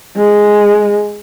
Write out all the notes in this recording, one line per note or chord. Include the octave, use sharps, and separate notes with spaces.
G#3